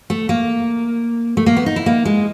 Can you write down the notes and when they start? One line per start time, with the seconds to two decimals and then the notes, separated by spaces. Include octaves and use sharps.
0.10 A3
0.29 A#3
1.37 A3
1.46 A#3
1.57 B3
1.66 D#4
1.76 E4
1.86 A#3
2.05 G#3